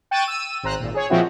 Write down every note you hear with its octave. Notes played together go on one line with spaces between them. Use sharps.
G5 C#6 F#6 A6 D#7 E7
E6 D#7
G#1 C5 A#5 F#6
G#1 A#2
G#4 C#5
A#2 F3 G#3 C4 E4 F#4